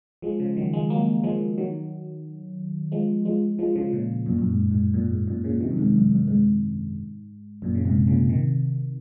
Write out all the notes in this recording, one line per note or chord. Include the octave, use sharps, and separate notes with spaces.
F3 G#3
C#3 F3
D#3 F#3
F3 G#3
F#3 A#3
F3 G#3
D#3 F#3
F3 G#3
F3 G#3
F3 G#3
C#3 F3
A#2 C#3
F#2 A#2
F#2
G#2
G#2
F#2 A#2
G#2
F#2 A#2
A#2 C#3
C3 D#3
F#2
G#2
F#2
F#2
G#2
F#2 A#2
C#3
G#2 C3
A#2 C#3
C3 D#3